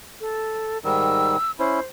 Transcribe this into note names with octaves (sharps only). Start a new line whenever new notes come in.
A4
G#2 D#3 G3 E6
C#4 E4 C5